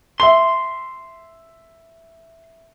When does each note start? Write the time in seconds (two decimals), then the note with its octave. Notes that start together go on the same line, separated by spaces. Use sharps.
0.20 E5 C6 G7